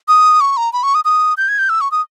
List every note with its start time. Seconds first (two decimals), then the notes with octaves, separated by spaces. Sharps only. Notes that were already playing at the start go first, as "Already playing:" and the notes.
0.08 D#6
0.41 C#6
0.57 A#5
0.73 B5
0.83 C#6
0.95 D#6
1.05 D#6
1.37 G6
1.49 G#6
1.59 G6
1.69 E6
1.81 C#6
1.92 D#6